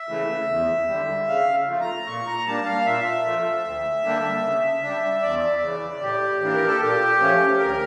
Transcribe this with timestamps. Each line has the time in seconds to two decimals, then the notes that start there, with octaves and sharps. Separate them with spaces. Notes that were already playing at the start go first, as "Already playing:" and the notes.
Already playing: E5
0.09 C#3 E3 A3
0.48 E2
0.88 D3 G3
1.27 C#3 F5
1.67 F3 A3
1.81 A#5
2.07 A#2 C#6
2.27 A#5
2.47 G3 A#3 D4 A5
2.66 F5
2.85 A#2 E5
3.26 F3 A3
3.64 D2
4.04 D3 G3 A#3 D4
4.43 C#3
4.83 G3 D4
5.22 E2 D5
5.62 C#3 E3
6.01 A2 G4
6.41 E3 A#3 D4
6.54 A#4
6.67 A4
6.81 A#2 G4
7.20 F3 A3 C#4
7.60 D2 A#4